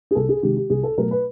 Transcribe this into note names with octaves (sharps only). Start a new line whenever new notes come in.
G#4
C2 A4
G#4
C3 D#3 G#3 G4
G4
C2 G#4
A4
B2 F#3 A3 A#4
B4